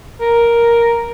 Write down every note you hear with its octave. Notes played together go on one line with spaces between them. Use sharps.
A#4